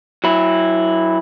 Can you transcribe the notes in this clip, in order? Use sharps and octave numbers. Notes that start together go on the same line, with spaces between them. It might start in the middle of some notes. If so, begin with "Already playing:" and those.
F#3 E4